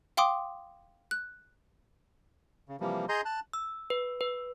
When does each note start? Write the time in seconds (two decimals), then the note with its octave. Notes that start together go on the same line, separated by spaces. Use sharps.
0.17 F5 G5 C6 D6 D#6
1.11 F#6
2.69 C#3
2.80 C3 E3 F3 G3 A#3
3.09 G#4 D#5 A#5 C6 G6
3.25 A5 F#6
3.53 E6
3.90 B4
4.21 B4